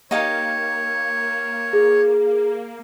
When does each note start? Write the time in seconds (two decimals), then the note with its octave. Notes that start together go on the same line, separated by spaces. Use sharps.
0.11 A#3 D#4 G4 C#5 F5
1.73 G#4